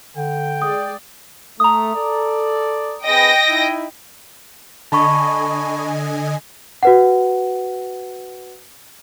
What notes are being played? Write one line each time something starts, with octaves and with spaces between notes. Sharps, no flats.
D3 G5
G#3 G#4 D5 D#6
A3 A#5 D#6
A4 D5
C4 G#4 B4 D#5 G5 A#6
D#4 E4
D3 D#5 G#5 A5 B5 C#6
F#4 B4 F#5